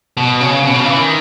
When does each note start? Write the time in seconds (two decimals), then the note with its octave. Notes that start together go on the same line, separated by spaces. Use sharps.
0.17 B2
0.41 C#3
0.63 B2
0.74 C#3
0.86 E3
0.97 D#3